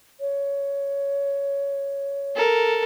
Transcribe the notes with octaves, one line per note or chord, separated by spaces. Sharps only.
C#5
A4 A#4